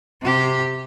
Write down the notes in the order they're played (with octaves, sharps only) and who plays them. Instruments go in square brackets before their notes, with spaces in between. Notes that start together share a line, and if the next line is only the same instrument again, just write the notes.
[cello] C3 G4